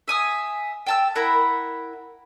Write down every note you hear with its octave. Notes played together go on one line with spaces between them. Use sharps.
E5 G#5 D#6
G5 A5 E6
E4 A#4 F#5 B5